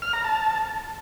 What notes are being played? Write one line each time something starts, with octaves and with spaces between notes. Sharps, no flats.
F6
A#5
A5